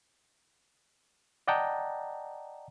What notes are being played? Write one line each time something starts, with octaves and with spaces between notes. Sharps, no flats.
D5 D#5 F#5 G5 A5 A#5